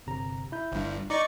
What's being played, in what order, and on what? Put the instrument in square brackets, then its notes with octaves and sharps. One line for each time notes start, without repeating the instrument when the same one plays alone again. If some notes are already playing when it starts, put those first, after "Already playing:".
[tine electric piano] G1 C3 A#5
E4 G6
[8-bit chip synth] G1 G2
[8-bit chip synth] D#4 D5 C#6 [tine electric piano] D6 A6